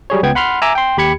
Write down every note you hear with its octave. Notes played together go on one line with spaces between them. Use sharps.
F#3 G3 G#4 C#5
C#2 B3 G5 G#6
F#5 B5 C6 F6
E5 G#5 A#5 D6 E6
G5 C6
D#2 G4 B5 G#6 C#7